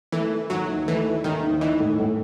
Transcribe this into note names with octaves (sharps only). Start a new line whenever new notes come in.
E3 A3
E4
D#2 F#3
D#3
E3 A3
E4
D#2 D#3
D#3
E3 D#4
A2
A2